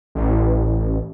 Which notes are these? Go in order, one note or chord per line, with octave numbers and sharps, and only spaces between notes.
A1